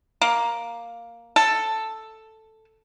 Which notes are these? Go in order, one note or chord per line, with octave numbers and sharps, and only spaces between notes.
A#3
A4